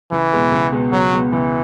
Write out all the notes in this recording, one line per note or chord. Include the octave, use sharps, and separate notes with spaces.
C#2 E3
B2 G#3 B3
C#2
B2 G#3 B3
C#2 F#3
B2 G#3 B3
C#2 E3